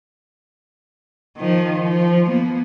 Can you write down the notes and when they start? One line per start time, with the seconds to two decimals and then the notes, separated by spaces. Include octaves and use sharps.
1.38 D#3 F3
1.80 F3
2.27 A#3 B3